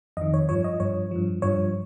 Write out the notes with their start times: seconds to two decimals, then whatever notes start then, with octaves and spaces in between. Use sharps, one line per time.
0.17 F2 D#3 D#5
0.34 C#5
0.49 G2 F3 C#5
0.64 D#5
0.80 G2 F3 C#5
1.11 G2 F3
1.42 G2 F3 C#5